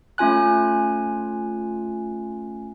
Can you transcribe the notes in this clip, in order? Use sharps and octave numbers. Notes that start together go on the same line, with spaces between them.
A3 C#4 F4 G#5 F#6